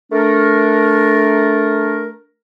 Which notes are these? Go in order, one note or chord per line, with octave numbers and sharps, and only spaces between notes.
A3 D4 A#4